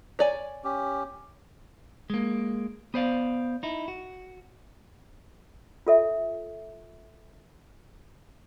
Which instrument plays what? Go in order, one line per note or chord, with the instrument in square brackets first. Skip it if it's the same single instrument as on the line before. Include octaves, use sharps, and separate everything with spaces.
[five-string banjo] C#5 D5 G#5
[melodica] C#4 G4
[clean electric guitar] G#3 A#3
B3 C5 D5 F5
D#4 E4
F#4
[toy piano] F4 A4 E5